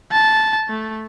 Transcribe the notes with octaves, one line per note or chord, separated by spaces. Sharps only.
A5
A3